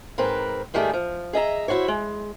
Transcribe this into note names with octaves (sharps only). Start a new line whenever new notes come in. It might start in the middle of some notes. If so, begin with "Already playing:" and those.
G#2 C4 A#4 B4
G#2 D#3 G3 A3 G4 G#4
F3
G#4 D#5 E5 A#5
E4 F#4 C5 C#5
G#3